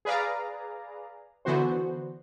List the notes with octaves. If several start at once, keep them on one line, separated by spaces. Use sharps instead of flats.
G#4 B4 D5 F5 A#5
D3 E3 B3 F#4 C5